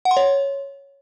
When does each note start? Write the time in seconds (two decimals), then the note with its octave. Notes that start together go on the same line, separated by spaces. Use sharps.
0.05 F#5
0.11 C6
0.17 C#5